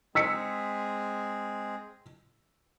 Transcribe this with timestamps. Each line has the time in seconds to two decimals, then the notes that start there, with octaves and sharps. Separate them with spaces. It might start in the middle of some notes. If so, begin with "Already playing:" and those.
0.15 G#3 C4 G#4 E6 B6 C#7